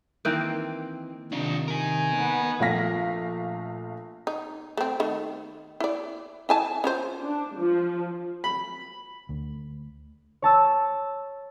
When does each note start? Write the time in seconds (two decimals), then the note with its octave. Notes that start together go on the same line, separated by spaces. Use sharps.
0.25 D#3 E3 A#3 C4
1.32 C3 D#3 D4 D#4 F4
1.68 D#4 A#4 G#5
2.16 B3
2.60 A#1 A3 F5 A#6 B6
4.27 D#4
4.77 A3 C4
5.00 D#3 A3
5.80 E4 D5
6.49 E4 G#5 A5
6.84 C#4 F4 C5
7.22 D4
7.57 F3
8.44 B5
9.29 D2
10.42 C#5 A5 E6